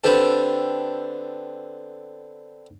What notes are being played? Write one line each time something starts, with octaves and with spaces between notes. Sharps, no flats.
D3 B3 C4 G4 A4